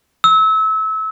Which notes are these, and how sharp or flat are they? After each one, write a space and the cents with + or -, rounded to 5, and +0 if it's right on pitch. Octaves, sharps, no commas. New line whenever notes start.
E6 -25